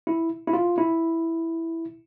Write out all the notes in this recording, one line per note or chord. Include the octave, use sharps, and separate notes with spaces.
E4
E4
F4
E4